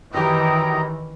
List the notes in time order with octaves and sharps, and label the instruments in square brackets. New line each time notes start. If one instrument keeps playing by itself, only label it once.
[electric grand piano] F#2 G4 [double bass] D#3 E3 [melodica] D#4 D#5 A#5 [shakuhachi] G5